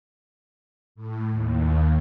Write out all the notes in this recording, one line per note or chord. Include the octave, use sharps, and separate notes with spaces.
A2
D#2